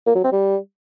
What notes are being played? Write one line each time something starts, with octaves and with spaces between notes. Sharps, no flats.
A#3
F#3
C4
G3